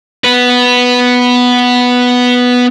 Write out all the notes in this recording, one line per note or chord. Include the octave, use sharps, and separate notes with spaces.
B3 B4